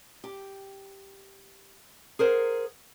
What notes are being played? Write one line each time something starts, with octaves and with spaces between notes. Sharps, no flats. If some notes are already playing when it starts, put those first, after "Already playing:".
G4
G#4 A#4 C5 F#5